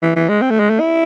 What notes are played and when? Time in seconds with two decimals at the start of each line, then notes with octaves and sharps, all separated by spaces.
0.02 E3
0.16 E3
0.29 G#3
0.42 C4
0.50 A3
0.60 G#3
0.70 A3
0.80 E4